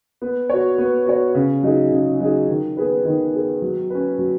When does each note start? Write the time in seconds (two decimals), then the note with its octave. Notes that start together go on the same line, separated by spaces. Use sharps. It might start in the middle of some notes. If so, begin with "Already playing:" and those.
0.22 B3
0.49 F#4 C#5
0.78 B3
1.06 F#4 C#5
1.35 C#3
1.63 F#3 D#4 G#4
1.91 C#3
2.20 F#3 D#4 G#4
2.48 D#3
2.77 B3 G#4 B4
3.05 D#3
3.33 B3 G#4 B4
3.62 F#3
3.90 C#4 B4
4.19 F#3